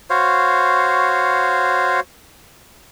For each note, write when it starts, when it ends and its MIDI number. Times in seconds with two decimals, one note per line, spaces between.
0.10 2.00 66
0.10 2.00 72
0.10 2.00 73
0.10 2.00 77